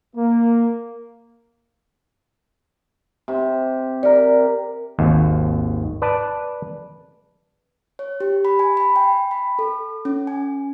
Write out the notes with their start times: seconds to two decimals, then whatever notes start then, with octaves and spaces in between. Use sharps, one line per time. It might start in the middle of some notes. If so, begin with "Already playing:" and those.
0.16 A#3
3.28 C3 G4
4.03 G4 A#4 D5
4.99 G#1 D#2
6.02 B4 D5 A5
7.99 C#5
8.20 G4
8.45 B5
8.59 G#5
8.77 B5
8.96 G5
9.31 B5
9.59 A4
10.05 C#4
10.27 G#5